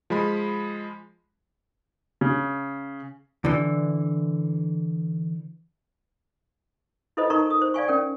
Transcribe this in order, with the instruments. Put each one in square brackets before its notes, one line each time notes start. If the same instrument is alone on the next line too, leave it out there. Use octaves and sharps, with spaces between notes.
[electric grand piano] F3 G#3 B5
[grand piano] C#3
[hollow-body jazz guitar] D3 E3
[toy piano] E4 F4 A4 B4 C5 D#5
D#4 A#4 B4 A#5 C#6
A4 D#6
C5
D5 F5 G#5 C#6
C#4 A#4 G5